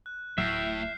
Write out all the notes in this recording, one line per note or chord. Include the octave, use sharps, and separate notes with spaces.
F#6
D1 A2 F#3 A3 E5 F6 G6 C7